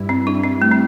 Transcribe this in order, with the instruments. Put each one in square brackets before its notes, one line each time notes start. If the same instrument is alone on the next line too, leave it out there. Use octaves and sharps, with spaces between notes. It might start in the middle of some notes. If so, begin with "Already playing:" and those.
Already playing: [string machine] G2 G3 E4
[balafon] C4
D4
C4
A3
C4